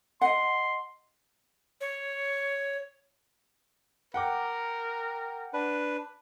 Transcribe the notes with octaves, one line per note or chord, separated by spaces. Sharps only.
D#5 F#5 C6
C#5
A#4 F#5 G5 D6
D4 B4